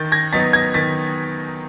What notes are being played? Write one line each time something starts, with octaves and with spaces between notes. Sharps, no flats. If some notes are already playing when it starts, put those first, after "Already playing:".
Already playing: D#3 G6 A6
G#6 A#6
F#3 B3 D#4 A6 B6
G#6 A#6
D#3 A6 B6